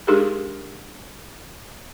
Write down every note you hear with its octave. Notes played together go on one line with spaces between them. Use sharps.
G#3 D4 D#4 G4 G#4 A#4